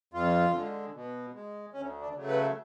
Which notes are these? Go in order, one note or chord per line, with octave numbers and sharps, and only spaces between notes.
F2 F4
D3 G#3
B2
G#3
D2 C#4
D4
C#3 F#3 A3
B4